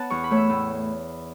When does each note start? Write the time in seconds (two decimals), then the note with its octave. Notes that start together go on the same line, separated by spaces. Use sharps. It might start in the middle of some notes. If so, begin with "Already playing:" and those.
Already playing: B3 C#5 F#5 A5
0.10 E2 C#6
0.24 B5
0.31 A3 C#5
0.37 E5
0.50 A2